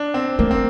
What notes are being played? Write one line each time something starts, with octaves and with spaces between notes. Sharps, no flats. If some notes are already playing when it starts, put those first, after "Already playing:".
Already playing: D4
C4
A3 A#3
C4